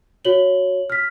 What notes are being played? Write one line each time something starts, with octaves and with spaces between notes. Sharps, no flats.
F#4 C#5 F#7 G7
F6 B6